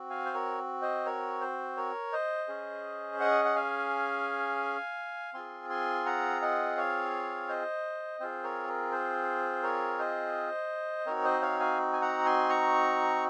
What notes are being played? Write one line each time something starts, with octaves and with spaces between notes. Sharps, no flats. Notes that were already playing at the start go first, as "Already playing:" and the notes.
Already playing: C4 F#4
F5 G#5
C5
A#4 C#5
C5 D#5
A#4 C#5
C5
A#4 C#5
C5 D#5
C#4 G#4
D#5 F#5
F#5
F5 G#5
C4 F4 G#4 G#5 C6
G#5 C6
F#5 A#5
D#5 F#5
C#5 F5
C5 D#5
C4 F4 G#4 C5
A#4 C#5
A#4
C5
A#4 C#5
C5 D#5
C4 D#4 F#4 A#4 C#5
C5 D#5
C#5 F5
F5 G#5
G#5
F#5 A#5
G#5 C6
A#5 C#6